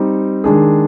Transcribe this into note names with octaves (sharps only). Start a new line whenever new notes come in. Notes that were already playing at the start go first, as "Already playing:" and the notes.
Already playing: G3 C4 D#4
D#3 G#3 D4 G#4